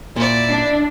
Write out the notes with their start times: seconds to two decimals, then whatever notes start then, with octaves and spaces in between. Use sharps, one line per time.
0.16 A#2 E4 D5
0.49 D4